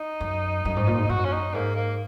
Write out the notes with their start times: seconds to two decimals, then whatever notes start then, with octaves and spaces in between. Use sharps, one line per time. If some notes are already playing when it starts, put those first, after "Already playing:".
Already playing: D#4
0.21 F#2
0.65 F#2
0.76 G#2
0.87 A#2
0.98 G#2
1.09 F#2 F#4
1.24 C#4
1.32 D#4
1.54 G#2 A#3
1.76 A#3